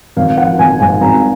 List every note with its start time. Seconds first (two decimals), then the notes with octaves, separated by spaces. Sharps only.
0.16 G#1 F5
0.37 F3 F#5
0.59 G#1 G#5
0.80 G#2 G#5
1.01 G#1 A#5